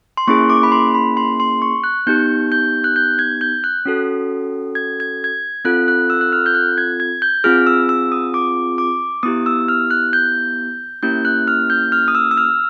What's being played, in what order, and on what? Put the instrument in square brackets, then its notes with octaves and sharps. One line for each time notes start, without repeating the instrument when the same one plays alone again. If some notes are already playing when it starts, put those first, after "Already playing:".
[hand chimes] C6
A#3 C#4 E4 G#4 C#6
D6
B5
C6
B5
C6
C6
C#6
F#6
B3 D#4 G4 G6
G6
F#6
G6
G#6
G6
F#6
C#4 F#4 A4
G#6
G#6
G#6
C4 F4 A4 F#6
F#6
E6
F#6
F6
G6
F#6
G#6
G#6
G6
C4 F4 G#4 F6
E6
E6
D#6
D6
D6
B3 E4 G4 D#6
E6
F6
F#6
G6
A#3 C#4 E4 G4 G6
F#6
F6
G6
F6
D#6
E6
E6
F6